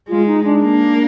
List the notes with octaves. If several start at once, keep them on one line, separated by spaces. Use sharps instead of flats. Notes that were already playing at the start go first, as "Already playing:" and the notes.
G#3 F4
D#4
D4
A#3